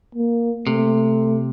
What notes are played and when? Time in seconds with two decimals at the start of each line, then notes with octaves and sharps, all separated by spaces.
0.15 A#3
0.67 C3 A3